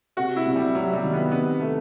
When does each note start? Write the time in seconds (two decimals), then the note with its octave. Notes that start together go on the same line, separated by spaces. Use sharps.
0.17 C3 F#4
0.36 E4
0.46 C2
0.56 G3
0.75 C2 F#3
0.93 G3
1.03 D#3
1.14 B3
1.32 C3 B3
1.61 A3